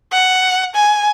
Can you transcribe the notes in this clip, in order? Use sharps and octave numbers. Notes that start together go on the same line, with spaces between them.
F#5
G#5